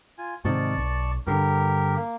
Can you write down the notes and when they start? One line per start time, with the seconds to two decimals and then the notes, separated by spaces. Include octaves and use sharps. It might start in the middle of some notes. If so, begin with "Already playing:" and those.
0.18 F4 G#5
0.45 G#2 C3 D#3 D5 A5 C#6
0.77 B1
1.27 G2 D3 G4 A#4
1.96 A#3